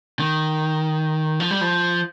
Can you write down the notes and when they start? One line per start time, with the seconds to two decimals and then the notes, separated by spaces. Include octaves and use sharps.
0.19 D#3
1.40 F3
1.51 G3
1.61 F3